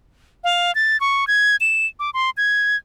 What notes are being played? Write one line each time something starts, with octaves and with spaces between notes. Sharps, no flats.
F5
A6
C#6
G#6
E7
D6
C6
G#6